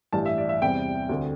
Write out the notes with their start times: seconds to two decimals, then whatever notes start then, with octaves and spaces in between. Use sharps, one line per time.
0.13 A1 G2 E3 A5
0.25 E5
0.38 D5
0.49 E5
0.62 E2 C3 G3 C4 G5
1.09 D2 D3 A3 C4